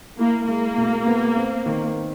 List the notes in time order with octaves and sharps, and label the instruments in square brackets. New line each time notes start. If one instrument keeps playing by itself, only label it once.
[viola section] A#3 [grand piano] E4
[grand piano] G#3 [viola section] A#3
[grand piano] B2
B3
C4
D#3